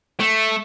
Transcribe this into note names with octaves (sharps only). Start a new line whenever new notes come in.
A3